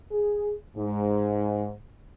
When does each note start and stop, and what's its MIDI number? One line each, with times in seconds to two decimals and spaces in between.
0.12 0.52 68
0.76 1.71 44